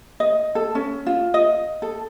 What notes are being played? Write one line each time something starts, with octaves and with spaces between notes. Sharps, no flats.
D#5
A4
C#4
F4
D#5
A4